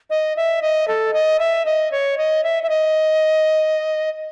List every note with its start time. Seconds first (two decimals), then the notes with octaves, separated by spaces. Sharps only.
0.10 D#5
0.37 E5
0.62 D#5
0.88 A4
1.14 D#5
1.39 E5
1.65 D#5
1.92 C#5
2.18 D#5
2.44 E5
2.63 E5
2.69 D#5